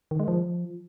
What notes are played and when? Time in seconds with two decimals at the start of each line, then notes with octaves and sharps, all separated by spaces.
0.11 D#3
0.20 G#3
0.28 F3